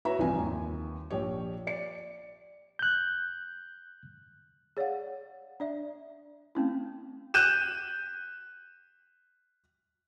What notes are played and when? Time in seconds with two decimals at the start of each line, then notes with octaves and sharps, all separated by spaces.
0.05 E4 F#4 B4 C#5 E5 A#5
0.19 C2 F2 E3 F4 G#5
0.38 D#2
1.10 A#1 G4 C#5
1.67 D5 C#7
2.79 F#6 G6
4.77 G#4 C#5 D5 F5 F#5
5.60 D4 D5 E5
6.55 A3 C4 C#4 E4
7.34 F#6 G6 D#7 E7